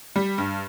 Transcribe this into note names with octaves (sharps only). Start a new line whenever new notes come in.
G3
G2